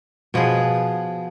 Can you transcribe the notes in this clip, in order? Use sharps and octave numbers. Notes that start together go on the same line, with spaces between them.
B2 F3 B3 G#4